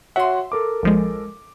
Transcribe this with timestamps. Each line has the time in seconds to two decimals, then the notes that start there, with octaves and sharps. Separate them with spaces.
0.16 F#4 C#5 E5 F#5 C6
0.52 A4 A#4 D6
0.83 A#1 F3 G#3